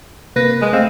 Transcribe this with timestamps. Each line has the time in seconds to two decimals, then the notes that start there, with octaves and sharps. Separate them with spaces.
0.36 C3 A#3 B4 A#6
0.61 G#3
0.73 A3 C4 F5